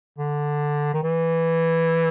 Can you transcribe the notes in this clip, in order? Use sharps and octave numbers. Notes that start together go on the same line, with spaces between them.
D3
D#3
E3